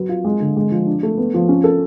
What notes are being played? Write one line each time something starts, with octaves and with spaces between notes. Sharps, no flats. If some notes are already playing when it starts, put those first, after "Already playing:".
Already playing: F#3 B4
F4
G#3
D3
G#3
F3
D4
A3
B3
F3
C#4
A4